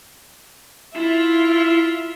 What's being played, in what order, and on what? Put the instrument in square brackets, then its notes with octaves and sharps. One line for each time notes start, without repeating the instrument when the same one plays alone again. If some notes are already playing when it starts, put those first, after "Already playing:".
[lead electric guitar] E4 [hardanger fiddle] F4 E5